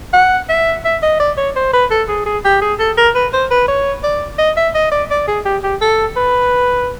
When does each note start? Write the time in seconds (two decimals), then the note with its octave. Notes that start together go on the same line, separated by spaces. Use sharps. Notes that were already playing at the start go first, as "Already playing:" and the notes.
0.13 F#5
0.49 E5
0.85 E5
1.03 D#5
1.20 D5
1.37 C#5
1.56 C5
1.73 B4
1.91 A4
2.09 G#4
2.26 G#4
2.45 G4
2.62 G#4
2.79 A4
2.97 A#4
3.15 B4
3.33 C5
3.51 B4
3.68 C#5
4.03 D5
4.38 D#5
4.57 E5
4.75 D#5
4.92 D5
5.10 D5
5.28 G#4
5.45 G4
5.63 G4
5.81 A4
6.16 B4